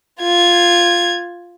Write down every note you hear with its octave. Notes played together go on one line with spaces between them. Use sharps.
F4 G#6